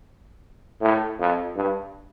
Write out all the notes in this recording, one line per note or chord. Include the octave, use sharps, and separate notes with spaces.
A2
F2
G2